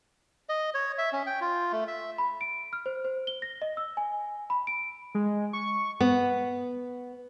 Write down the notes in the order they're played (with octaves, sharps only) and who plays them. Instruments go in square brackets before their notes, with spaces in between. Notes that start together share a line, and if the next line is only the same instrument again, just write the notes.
[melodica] D#5
C#5
E5
C#4
G5
F4
A3
E5
[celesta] B5
D7
F6
C5
C5
G7
A#6
D#5
E6
G#5
B5
D7
[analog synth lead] G#3
C#6
[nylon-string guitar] B3